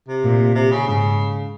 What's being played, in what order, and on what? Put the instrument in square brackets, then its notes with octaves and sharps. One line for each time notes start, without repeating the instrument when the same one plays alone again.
[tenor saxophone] C3
[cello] A#2
[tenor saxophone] C3
C#3
[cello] G#2 [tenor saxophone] C#3